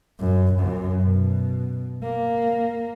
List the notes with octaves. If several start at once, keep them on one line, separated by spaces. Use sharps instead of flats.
F#2
F#2
B2
A#3